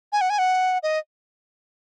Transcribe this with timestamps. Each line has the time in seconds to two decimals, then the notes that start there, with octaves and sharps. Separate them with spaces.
0.12 G#5
0.21 F#5
0.30 G#5
0.39 F#5
0.83 D#5